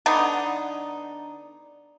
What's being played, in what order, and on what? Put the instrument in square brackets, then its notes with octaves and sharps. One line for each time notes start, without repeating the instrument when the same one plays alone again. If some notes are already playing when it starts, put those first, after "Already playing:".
[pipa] D3 B3 D#4